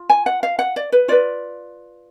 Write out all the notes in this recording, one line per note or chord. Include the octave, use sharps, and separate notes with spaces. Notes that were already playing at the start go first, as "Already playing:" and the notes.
Already playing: F4
G#5
F#5
F5
F#5
D5
B4
F4 B4 D5